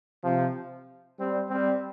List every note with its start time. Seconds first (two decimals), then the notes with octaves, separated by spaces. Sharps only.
0.24 C3 F3
1.19 G3 C4
1.49 G3 C4